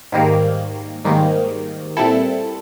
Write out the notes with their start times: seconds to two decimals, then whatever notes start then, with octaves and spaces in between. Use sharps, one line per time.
0.12 G#2 D#3 G3 A#3
1.05 G#2 D#3 G3 A#3
1.97 A#2 G3 C4 E4 A4